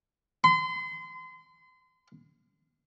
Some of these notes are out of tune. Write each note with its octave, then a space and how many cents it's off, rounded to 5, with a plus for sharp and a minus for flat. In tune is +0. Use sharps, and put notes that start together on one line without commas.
C6 -35